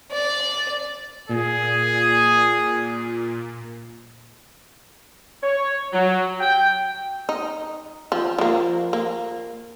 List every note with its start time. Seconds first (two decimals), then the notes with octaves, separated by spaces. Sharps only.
0.12 D5
1.29 A#2 G#4
5.43 C#5
5.93 F#3
6.40 G5
7.29 D#4
8.12 F3
8.38 F3 A#3
8.93 A#3